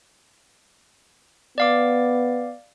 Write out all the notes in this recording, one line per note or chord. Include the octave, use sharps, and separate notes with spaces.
B3 D5 F5 D6